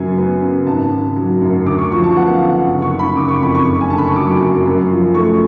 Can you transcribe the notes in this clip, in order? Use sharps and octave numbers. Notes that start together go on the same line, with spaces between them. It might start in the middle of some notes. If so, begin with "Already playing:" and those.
Already playing: F#2 C#3 F#3 G#5
B3
C#3
G#1 A5
C#3
F#3
F#2
D2 D6
C#6
F3 C#6
A5
B3 F#5
F5
D3
F#5
F#1
C#6
C#3
B5
F#1 D6
C#6
F2 B5
C#6
F#1
G#5
D3 A5
B5
C#6
F#3 D6
F#2
F#2
F3
A3 C#6